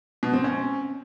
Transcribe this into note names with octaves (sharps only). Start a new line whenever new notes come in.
B2
C4
C#4